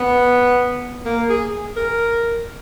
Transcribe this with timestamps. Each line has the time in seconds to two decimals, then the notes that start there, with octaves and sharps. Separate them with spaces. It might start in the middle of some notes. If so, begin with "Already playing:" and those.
Already playing: B3
1.05 A#3
1.29 G#4
1.77 A#4